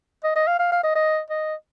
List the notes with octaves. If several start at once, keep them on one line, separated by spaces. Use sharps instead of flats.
D#5
D#5
F5
F5
F5
D#5
D#5
D#5